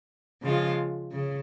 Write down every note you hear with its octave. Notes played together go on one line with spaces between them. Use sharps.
C#3 F3 G#3 F4
C#3